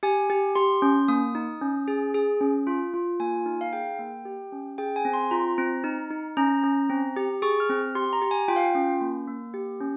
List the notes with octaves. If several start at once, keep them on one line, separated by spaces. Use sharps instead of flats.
G4 G#5
G4
G4 C6
C#4
A#3 D#6
D#4
C#4
G#4
G#4
C#4
F4
F4
A#3 G#5
D#4
F5
G#4 G5
A#3
G4
C#4
G#4 G5
G#5
C4
C6
F4 A#5
C4
D#4
D#4
C#4 A#5
C#4
C4
G4
G#4 C#6
F6
C4
G4 C6
A#5
G4
G#5
F4 G5
F5
G5
C#4
A#3
A#3
G4
C#4